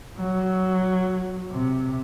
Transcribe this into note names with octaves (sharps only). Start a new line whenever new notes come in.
F#3
C3